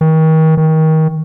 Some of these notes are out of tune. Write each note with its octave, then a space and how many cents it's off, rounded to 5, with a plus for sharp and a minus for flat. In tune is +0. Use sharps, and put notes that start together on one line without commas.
D#3 +35
D#3 +25